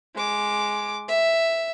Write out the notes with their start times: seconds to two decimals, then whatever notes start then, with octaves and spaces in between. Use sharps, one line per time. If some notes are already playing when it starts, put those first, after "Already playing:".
0.15 G#3 D6
1.08 E5